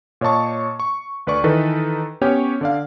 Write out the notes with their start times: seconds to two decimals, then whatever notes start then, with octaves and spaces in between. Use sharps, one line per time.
0.21 A#2 C#5 D#5 A5 C#6
0.80 C#6
1.27 D2 B4 D5 C#6
1.44 D#3 E3 D#4 A4 B4
2.21 B3 C#4 G4 C#5 G5
2.61 D3 D5 F5